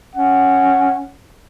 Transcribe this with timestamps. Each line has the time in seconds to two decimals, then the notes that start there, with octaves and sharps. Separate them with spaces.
0.15 C#4 F#5